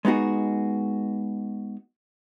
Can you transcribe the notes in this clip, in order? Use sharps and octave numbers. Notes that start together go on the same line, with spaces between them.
G#3 B3 D#4 F#4 G#4